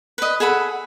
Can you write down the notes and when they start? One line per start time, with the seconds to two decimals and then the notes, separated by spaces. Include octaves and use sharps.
0.18 B4 D#5
0.40 G#4 A4 F#5 B5